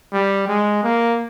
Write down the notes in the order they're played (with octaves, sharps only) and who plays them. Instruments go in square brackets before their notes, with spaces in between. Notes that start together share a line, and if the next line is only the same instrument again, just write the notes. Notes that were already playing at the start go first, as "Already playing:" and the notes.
[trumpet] G3
G#3
A#3